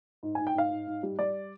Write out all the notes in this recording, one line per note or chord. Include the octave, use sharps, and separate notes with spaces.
G#2
G#5
G#2
G5
G#2 F5
G#2
G#2
G3
G3 D5